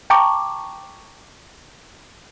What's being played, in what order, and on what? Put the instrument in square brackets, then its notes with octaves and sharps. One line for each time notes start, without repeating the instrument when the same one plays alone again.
[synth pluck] G5 A5 A#5 C#6 D6